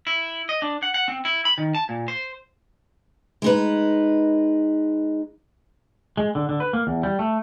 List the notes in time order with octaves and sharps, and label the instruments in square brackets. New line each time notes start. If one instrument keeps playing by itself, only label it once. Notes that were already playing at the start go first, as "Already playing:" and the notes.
[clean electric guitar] E4
D#5
D4
F#5
F#5
C4
E4
B5
D#3
A5
A#2
C5
[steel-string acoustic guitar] G#3 D#4 B4
[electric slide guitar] G#3
D3
D3
B4
A#3
E2
G3
A3